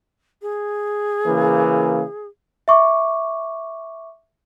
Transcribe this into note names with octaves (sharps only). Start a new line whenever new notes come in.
G#4
C#3 E3 A#3
E5 C#6 D6